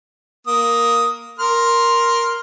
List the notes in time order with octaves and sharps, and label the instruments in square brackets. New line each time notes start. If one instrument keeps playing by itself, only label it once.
[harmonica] A#3 D#6
A#4 C6 F6